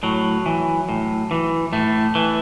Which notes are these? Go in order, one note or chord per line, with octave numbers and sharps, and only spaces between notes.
A2 F#3
E3
A2
E3
A2 A3
E3